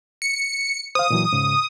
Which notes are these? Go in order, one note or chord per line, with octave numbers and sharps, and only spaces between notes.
C#7
C5 F5 D#6
A#2 E3 F#3
G#2 C#3